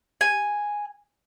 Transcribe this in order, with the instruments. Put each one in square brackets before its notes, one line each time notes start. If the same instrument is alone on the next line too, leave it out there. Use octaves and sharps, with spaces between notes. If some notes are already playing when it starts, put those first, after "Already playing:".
[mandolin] G#5